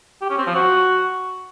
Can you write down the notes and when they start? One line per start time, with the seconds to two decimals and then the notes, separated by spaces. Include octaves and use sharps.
0.21 G4
0.30 C#4
0.38 C4
0.47 F3
0.55 F#4